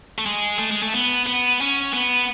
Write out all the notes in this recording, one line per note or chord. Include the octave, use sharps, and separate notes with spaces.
A3
G#3
A3
G#3
A3
B3
B3
C#4
B3